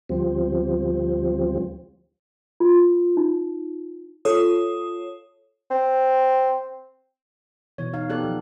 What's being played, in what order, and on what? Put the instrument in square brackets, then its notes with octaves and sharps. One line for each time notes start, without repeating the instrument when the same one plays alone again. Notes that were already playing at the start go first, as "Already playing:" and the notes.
[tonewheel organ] D2 F3 G3 C4
[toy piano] F4
D#4
[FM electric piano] F4 A4 C#5 D#6
[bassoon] C4
[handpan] B2 E3 [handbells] C#5
[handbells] D#4 [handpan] F5
[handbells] B3 D#4 F#6 [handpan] G4 A4 D5
[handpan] F3